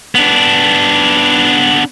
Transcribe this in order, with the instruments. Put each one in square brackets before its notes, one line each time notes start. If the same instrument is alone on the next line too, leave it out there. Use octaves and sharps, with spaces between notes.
[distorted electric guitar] B3 D4